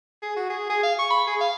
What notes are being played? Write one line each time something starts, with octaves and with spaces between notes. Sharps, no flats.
G#4
F#4
G#4
G#4
F5
C#6
B5
G#4
F5